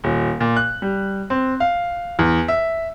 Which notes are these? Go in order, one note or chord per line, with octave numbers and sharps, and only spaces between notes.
D#1
A#2
F#6
G3
C4
F5
E2
E5